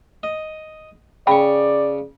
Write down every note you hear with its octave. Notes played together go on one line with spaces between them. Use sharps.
D#5
C#3 D5 G5 B5 C#6